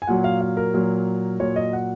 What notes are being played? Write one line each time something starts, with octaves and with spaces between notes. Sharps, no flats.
G#5
A#2 F#3 F#5
F5
F5
A#4
A#2 F#3
A#2 F#3 C#5
D#5
F#5